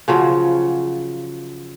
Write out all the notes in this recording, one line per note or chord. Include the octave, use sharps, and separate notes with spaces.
C#3 F3 F#3